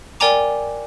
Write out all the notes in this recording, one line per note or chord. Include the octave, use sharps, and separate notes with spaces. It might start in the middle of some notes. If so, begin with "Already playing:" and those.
A#4 D5 G5 G#5 A#5 D6